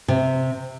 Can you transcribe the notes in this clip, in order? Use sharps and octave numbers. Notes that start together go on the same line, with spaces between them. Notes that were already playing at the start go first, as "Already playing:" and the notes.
C3